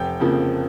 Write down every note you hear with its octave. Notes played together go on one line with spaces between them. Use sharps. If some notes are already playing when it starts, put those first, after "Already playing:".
Already playing: F1 G5
F2 C#3 F3 A#3